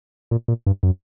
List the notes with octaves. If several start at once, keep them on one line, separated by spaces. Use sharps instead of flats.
A#2
A#2
G2
F#2